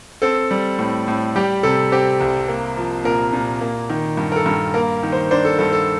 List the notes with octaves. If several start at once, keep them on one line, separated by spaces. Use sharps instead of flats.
C4 A4
G3
A2
A2
G3 G4
C3 A4
C4 G4
C2
A#3
F3
A#2 A#4
A#2
A#3
D#3
G2
A#4
A4
G2
A#3 A#4
D#3
C5
D4 C5
A4
G2 A4
A4